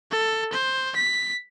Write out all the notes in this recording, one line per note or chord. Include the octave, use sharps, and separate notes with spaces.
A4
C5
B6